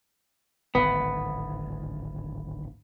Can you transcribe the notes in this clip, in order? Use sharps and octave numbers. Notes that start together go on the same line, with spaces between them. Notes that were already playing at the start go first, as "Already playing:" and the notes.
D1 G#1 G#2 B3